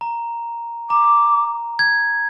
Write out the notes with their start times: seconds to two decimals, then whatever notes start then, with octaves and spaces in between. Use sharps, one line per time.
0.01 A#5
0.90 A#5 D6
1.79 G#6